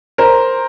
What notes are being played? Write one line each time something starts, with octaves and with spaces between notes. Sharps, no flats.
A#4 C5